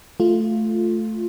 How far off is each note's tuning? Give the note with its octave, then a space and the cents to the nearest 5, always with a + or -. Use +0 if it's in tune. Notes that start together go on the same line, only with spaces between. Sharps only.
A3 -5 F4 +0